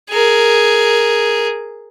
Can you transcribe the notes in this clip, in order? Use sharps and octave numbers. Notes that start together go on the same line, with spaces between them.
G#4 A#4